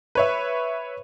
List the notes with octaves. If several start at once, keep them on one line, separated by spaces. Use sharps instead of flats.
B4 C#5 E5